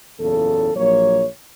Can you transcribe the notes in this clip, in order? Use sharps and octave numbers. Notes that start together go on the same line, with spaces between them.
F#1 E2 A#2 C#3 A4
A#1 F#3 A#3 C#5